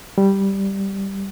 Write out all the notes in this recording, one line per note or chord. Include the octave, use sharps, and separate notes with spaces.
G3